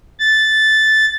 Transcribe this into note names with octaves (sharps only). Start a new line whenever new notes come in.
A6